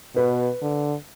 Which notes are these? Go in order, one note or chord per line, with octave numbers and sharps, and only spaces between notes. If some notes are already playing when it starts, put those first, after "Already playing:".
B2 B4
D3